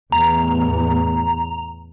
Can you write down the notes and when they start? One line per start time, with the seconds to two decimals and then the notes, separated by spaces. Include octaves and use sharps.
0.12 E2 A2 A#5